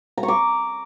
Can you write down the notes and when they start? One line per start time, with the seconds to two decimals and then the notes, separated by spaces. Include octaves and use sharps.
0.18 A#5
0.23 C#6
0.28 D6